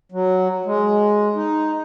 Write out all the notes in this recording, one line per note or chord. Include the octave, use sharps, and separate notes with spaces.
F#3
G#3
D#4